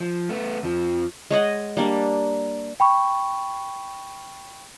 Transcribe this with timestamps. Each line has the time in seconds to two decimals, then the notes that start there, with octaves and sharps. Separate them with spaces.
0.01 F3
0.29 A3 B3
0.63 F2 F3
1.30 G#3 C#5 D#5 F#5
1.77 G3 A#3 D4
2.80 G5 B5 C#6